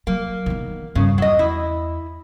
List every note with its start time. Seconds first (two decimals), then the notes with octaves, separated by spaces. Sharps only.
0.07 F#3 A#3
0.46 D#3 B3
0.95 G2 C#3
1.18 E2 F#3 D#5
1.39 E4